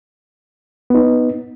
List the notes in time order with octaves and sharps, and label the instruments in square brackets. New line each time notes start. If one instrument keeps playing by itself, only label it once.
[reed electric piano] B3 D#4